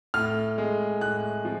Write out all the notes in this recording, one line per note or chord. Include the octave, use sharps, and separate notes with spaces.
A2 F6
G#3
A2 F#6
F3